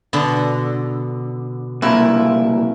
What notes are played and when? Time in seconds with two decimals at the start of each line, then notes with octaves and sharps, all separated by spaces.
0.13 B2 D3
1.82 C2 A#2 E4